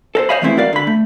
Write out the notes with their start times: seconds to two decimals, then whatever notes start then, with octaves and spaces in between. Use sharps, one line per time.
0.15 A4 A#4 C5
0.29 C5 C#5 D#5 F5 G#5 B5
0.42 E3 G#3 A3 C4 E4
0.57 F#4 A#4 D5 F5
0.73 D3 B5
0.87 A3